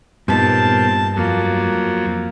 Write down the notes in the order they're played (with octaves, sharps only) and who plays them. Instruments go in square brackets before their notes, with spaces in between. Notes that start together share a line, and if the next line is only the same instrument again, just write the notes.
[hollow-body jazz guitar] G2 B3 D#4 [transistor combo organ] A#2 C4 [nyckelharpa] A5
[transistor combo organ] F2 F#3 [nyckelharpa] A#3